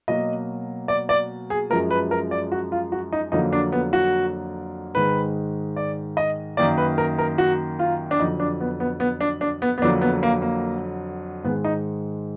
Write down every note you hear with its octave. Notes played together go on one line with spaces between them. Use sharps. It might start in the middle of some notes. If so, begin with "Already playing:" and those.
B2 F#3 A#3 D#5
D5
D5
G#4
F#2 F3 G#3 A#4
B4
A#4
D5
F#4
F4
F#4
D#4
F2 D3 F#3 A#3 D#4
D4
B3
F#4
G#2 D#3 G#3 B4
D5
D#5
F#2 D#3 A#3 D5
B4
A#4
A#4
F#4
F4
D4
F2 D3 F#3 D#4
D4
B3
B3
B3
D4
D4
B3
B3
F2 D3 F#3 A#3 D4
B3
A#3
A#3
G#2 D#3 G#3 B3
D#4